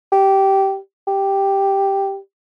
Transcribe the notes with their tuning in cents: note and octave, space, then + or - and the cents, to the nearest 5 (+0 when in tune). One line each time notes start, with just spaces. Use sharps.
G4 -15
G4 +0